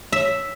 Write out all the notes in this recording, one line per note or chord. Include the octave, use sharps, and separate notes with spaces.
E5